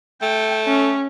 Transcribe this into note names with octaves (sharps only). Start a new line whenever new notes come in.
A3 G5
C#4